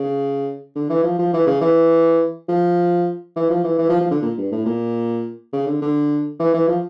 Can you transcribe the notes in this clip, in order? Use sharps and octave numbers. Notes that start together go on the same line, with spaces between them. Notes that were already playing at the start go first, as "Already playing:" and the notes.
Already playing: C#3
D3
E3
F3
F3
E3
C#3
E3
F3
E3
F3
E3
E3
F3
F3
D3
A#2
G2
A2
A#2
C#3
D3
D3
E3
E3
F3